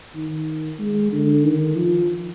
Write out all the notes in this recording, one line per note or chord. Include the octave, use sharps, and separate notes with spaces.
D#3
G#3
D3
D#3
F3